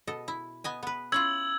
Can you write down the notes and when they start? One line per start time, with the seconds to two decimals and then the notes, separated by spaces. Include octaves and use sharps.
0.07 B2 A4 D#5
0.28 E4
0.64 B3 D#5 G#5
0.83 B3 B4
1.12 C#4 E4 F4 E6 G#6 F#7